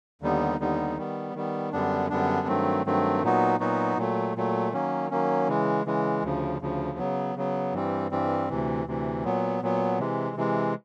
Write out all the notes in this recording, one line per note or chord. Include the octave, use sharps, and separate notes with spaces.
D#2 D3 G3 B3 D#4
D#2 D3 G3 B3 D#4
D#3 G3 B3
D#3 G3 B3
F#2 D3 G3 B3 D4
F#2 D3 G3 B3 D4
G2 D#3 F#3 A3 C4
G2 D#3 F#3 A3 C4
A#2 F#3 B3 D#4 F#4
A#2 F#3 B3 D#4 F#4
A#2 F#3 A3
A#2 F#3 A3
D#3 F#3 A#3 C#4
D#3 F#3 A#3 C#4
C#3 E3 G#3
C#3 E3 G#3
D2 C#3 F3
D2 C#3 F3
C#3 F#3 B3
C#3 F#3 B3
G2 E3 G3 C4
G2 E3 G3 C4
D2 C3 E3
D2 C3 E3
A#2 F#3 B3
A#2 F#3 B3
C3 E3 G#3
C3 E3 G#3